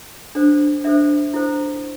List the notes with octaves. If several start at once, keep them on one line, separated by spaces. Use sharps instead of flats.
D4 A4 C5
D4 A4 C5 E5
E4 A4 C5